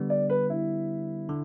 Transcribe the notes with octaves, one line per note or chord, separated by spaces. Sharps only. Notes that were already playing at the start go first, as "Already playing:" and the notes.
Already playing: D3 G3 B3
D5
B4
E4
D3